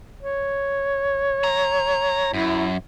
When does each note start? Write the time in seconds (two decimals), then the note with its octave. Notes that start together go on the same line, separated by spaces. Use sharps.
0.23 C#5
1.44 A#5
2.34 F#2 E4